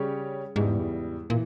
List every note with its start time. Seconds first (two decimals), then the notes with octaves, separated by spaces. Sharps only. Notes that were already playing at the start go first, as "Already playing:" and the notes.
Already playing: C#3 G3 C#4 G4 C#5
0.56 E2 G#2 C#3 G3
1.30 A#2 E3